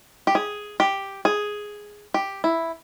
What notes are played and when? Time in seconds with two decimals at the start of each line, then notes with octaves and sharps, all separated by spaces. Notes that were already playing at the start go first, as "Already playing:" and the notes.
0.27 G4
0.35 G#4
0.80 G4
1.25 G#4
2.14 G4
2.44 E4